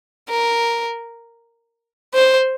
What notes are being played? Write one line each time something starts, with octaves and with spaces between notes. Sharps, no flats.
A#4
C5